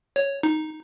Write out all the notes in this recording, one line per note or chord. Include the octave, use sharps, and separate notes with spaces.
C#5
D#4